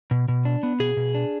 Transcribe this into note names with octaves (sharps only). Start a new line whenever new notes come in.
B2
B2
D4
B3
B2 G#4
B2
D4